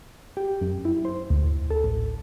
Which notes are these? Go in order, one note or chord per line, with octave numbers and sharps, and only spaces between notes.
G4
F#2
E4
C5
D2
A4
A1